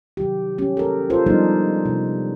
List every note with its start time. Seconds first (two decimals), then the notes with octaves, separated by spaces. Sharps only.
0.17 C3 D#3 F#3 G4
0.58 C#4 G4
0.77 A4 A#4
1.10 F4 A4 A#4 C5
1.26 F3 G3 G#3 B3 D4 D#4
1.86 C3